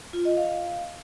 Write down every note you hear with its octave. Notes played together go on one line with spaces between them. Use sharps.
F4
D#5
F5